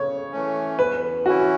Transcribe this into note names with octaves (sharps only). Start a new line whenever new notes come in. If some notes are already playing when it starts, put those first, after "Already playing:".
Already playing: C#3 C#5
E3 A3 C#4
E2 B4
E3 C#4 E4 F#4